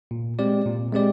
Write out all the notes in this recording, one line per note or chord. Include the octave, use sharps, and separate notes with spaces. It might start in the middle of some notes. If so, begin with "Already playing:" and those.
A#2
G#3 C4 G4 D5
A#2
G#3 C4 G4 D5